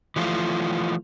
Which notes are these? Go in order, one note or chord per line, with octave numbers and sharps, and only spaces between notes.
E3 F3 A3 F4